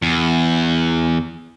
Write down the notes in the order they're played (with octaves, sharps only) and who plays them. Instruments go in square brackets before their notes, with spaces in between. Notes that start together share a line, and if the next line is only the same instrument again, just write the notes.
[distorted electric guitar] E2